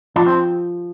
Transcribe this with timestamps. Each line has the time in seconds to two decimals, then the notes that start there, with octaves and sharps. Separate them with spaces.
0.16 F3 D4
0.27 C4